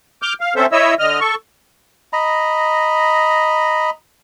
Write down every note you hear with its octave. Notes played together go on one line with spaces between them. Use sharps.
D6 F6 G6
F5
C4 C#4 A4 C5 E5
E4 C#5 D#5 E5 E6
D3 D#5 F6
A4 C#6
D#5 A#5 B5